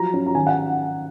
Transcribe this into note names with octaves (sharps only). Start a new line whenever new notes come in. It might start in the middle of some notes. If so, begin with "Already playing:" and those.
Already playing: F3 F#3 A#5
C#4
A#5
D#3 G#5
F#5